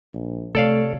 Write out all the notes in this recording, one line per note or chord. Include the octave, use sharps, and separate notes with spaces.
A#1
C3 A3 A4 C#5 D5 F5